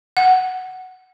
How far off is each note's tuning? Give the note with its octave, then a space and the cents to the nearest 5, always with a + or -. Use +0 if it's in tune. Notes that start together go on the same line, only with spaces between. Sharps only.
F#5 +5